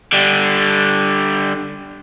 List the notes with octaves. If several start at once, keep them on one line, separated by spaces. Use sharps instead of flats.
D3 G3